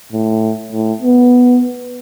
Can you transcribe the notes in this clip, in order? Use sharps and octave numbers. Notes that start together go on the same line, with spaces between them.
A2
A2
B3